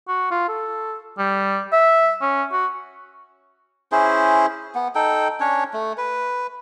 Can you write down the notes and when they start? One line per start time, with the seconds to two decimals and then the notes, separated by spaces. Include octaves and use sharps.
0.08 F#4
0.31 F4
0.49 A4
1.19 G3
1.73 E5
2.22 C#4
2.52 F#4
3.92 C#4 E4 G#4 C5
4.75 B3
4.95 D#4 A4 G5
5.40 C#4 D4 C#5
5.73 A3
5.98 B4